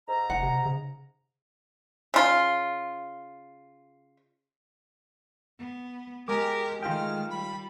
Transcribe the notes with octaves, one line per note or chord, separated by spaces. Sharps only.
G#2 A#5
F1 F#5
C3
C#3
C#3 F4
B3
G#3 G4 A#4 G#5 D6
D#3 A3 F4 G5 F6
G3 B5